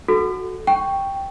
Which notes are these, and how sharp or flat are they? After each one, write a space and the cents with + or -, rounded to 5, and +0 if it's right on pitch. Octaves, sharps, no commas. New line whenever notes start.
F#4 +0 A4 -15
G5 +0 C#6 +0